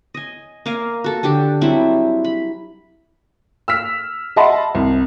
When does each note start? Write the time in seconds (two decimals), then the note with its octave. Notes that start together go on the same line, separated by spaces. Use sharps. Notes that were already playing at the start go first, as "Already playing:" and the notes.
0.14 D#5 G#5
0.66 A#3 A#4 F5 G#5
1.04 F#4 A4
1.23 D3 D4 G4 D5
1.61 F#3 G3 C4 E4
2.25 B5
3.68 E6 F6 B6
4.36 D#5 E5 F#5 A5 B5 C6
4.75 C2